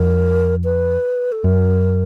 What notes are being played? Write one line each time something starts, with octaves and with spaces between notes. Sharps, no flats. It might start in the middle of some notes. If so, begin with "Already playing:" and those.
Already playing: F2 A#4
B4
A4
F#2 A#4